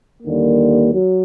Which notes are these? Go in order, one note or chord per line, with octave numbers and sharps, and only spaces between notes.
D#2 D3 G3 A#3
F#3